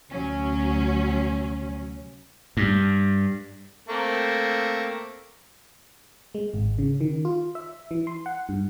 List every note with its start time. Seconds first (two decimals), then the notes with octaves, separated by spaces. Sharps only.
0.12 D2 C3 F#3 C#4
2.57 G2
3.89 A3 A#3 C4
6.35 G#3
6.54 G#1
6.78 C#3
7.01 D#3
7.25 F4
7.55 E5
7.91 E3
8.07 C6
8.26 F#5
8.49 G2